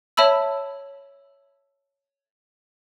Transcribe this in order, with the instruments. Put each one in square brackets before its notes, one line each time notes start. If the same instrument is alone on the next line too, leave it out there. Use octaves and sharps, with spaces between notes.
[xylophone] C#5 E5 A5 B5 E6